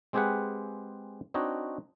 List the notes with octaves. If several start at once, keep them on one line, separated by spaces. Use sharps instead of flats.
G#3 C4 G4 G#4 B4 F#5
C4 D4 D#4 F#4 C#5 D#5